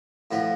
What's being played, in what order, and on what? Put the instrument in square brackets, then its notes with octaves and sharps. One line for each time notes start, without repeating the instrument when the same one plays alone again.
[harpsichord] A2 F3 B3